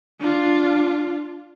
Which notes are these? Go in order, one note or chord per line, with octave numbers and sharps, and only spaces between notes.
D4 F4